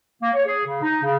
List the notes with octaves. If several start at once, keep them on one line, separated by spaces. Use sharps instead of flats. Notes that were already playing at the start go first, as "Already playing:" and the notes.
A#3
C#5
G#4
C#3
D#4
C#3